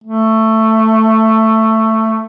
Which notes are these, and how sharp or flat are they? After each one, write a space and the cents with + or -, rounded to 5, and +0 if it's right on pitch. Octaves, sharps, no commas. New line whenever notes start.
A3 +10